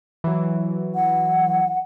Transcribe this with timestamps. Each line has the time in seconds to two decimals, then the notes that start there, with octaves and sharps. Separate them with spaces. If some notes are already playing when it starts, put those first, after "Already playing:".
0.24 E3 F#3
0.95 F#5